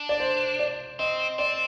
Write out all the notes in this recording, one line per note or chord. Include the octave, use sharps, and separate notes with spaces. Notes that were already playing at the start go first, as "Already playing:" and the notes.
Already playing: D4
D5
C5
D5
C4 D#5
C4 D5